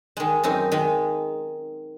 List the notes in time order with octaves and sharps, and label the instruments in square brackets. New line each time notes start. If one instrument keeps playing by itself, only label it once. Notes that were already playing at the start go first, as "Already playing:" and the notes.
[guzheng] D#3 G#3
F#2 C4 D#4
D#3 G#3